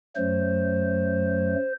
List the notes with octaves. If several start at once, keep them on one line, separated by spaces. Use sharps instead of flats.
F#2 F#3 A3 C5